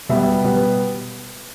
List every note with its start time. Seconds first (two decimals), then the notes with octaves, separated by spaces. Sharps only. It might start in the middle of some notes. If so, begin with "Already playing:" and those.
0.09 B2 G3 B3 E5
0.44 B2 G3 B3